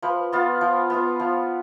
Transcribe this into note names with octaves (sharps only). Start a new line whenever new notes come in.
F3 B4
B3 F4
F3
B3 F4
F3